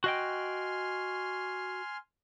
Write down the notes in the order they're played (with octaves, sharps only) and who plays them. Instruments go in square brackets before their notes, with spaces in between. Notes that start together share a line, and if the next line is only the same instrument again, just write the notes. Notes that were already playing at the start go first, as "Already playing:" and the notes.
[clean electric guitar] F#4 D#5 G5 [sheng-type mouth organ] G#5 C6 F6